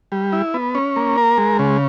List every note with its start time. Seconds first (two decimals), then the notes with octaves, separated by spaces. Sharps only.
0.12 G3
0.32 E4
0.54 B3
0.75 C#4
0.96 A#3
1.18 A#4
1.38 G#3
1.59 C#3